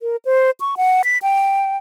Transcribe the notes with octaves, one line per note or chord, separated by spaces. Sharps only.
A#4
C5
C#6
F#5
B6
G5